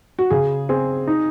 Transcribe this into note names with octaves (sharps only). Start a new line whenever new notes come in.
F#4
C#3 G#4
C4 G#4
D#4